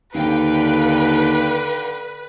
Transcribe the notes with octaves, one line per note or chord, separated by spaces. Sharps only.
D#2 D3 B4 F5 G5